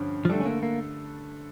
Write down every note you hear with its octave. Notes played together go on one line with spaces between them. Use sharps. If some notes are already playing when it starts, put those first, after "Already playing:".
Already playing: G2 D3 F3 C#4
F3
D3 G3 A3 D4 A4
C#4
A#3
A#3